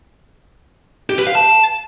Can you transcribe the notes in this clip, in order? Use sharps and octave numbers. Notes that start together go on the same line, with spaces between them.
G4
B4
F5
A5